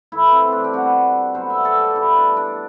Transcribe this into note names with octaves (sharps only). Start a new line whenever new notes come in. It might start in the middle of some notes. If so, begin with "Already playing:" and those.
A2 E3 A3 E4
C4
C4 D4
G4
C3 G3 B3 F#4
D3 F#3 B3 C5
E5
A4
G4
B2 G3 B3 E4
D4
D4